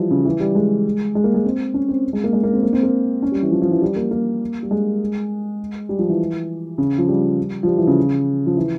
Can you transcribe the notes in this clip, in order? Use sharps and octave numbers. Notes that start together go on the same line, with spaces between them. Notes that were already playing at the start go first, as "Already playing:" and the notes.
Already playing: E3 F3 G3
C#3
E3
G3
G#3
G#3
A#3
G#3
C4
C#4
C4
G#3
A#3
G#3
A#3
C4
A#3
C4
A#3
C#4
G3
E3
F3
F3
E3
G3
A#3
A#3
G3
G#3
G3
F3
E3
C#3
F3
G3
F3
G3
E3
C#3
F3
E3